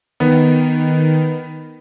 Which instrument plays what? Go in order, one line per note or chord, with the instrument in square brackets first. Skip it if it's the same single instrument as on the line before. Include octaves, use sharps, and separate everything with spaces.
[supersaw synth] D#3 [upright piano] B3